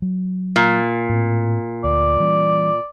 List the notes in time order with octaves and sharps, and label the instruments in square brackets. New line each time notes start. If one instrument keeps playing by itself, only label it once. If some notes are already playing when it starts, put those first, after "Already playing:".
[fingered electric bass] F#3
[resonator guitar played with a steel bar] A#2
[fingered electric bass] A2 C4
[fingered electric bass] D2 [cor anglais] D5
[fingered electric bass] E3 G3 C#4